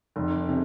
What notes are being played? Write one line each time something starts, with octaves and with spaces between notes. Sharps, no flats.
F1
C3